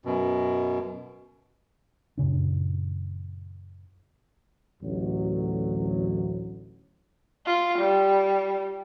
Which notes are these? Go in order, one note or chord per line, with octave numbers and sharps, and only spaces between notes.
F#2 B2
F#2 A#2 C#3 D4
A1 D2 F#3
F4
G3